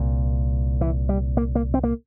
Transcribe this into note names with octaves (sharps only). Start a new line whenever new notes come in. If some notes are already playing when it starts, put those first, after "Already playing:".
Already playing: C2 A#2
E3
G3
A#3
A#3
C4
A#3